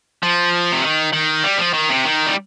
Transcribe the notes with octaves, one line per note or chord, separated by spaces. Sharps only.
F3
C3
D#3
D#3
G3
F3
D#3
C3
D#3
G3